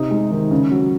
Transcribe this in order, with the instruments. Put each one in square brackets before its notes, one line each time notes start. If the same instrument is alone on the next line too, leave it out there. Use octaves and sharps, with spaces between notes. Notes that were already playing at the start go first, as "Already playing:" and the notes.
Already playing: [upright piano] C3 D#4
G#3
D#3
C#3
F#3